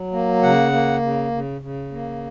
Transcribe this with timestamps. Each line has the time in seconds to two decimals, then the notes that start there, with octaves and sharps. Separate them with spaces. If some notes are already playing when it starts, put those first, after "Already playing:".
Already playing: F#3
0.12 A#3
0.42 C#3 F#5
0.72 A#3
1.02 C#3
1.31 C#3
1.61 C#3
1.92 A#3